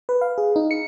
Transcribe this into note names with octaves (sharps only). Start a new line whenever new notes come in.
B4
F5
G#4
D#4
C#7